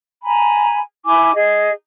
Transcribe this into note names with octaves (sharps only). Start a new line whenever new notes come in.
G#5 A#5 B5
E4 G#5 D6
G#4 D#5